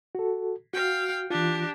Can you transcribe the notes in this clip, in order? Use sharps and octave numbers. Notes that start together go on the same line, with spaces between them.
F#4 A4
F#4 F5 G5
E3 D4 F4 G4